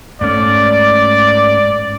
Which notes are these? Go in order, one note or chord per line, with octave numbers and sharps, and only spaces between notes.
G#2 A3 C#4 D5